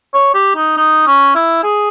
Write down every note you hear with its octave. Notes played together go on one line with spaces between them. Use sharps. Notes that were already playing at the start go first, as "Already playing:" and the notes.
C#5
G4
D#4
D#4
C#4
E4
G#4